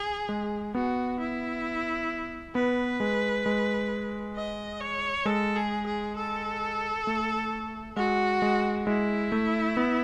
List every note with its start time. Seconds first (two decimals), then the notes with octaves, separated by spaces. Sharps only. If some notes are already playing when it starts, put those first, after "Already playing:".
Already playing: G#4
0.29 G#3
0.74 B3 F#4
1.19 E4
2.55 B3 B4
3.00 G#3
3.46 G#3
4.35 D#5
4.81 C#5
5.25 G#3 A4
5.56 G#4
5.86 G#4
6.16 A4
7.07 A3
7.96 G#3 F#4
8.42 G#3
8.87 G#3 E4
9.32 A3
9.77 B3